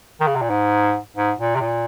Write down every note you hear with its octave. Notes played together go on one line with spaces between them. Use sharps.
D#3
C#3
C3
A#2
G#2
G#2
A#2
C3
A#2